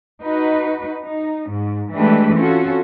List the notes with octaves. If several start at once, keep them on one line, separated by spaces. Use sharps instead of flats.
D#4 F#4 B4
D#4
G#2
E3 G#3 A3 D4 G4 B4
C4 C#4 F4 F#4 A4